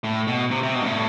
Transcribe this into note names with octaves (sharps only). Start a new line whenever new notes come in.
A2
B2
C3
C3
B2
G2
A2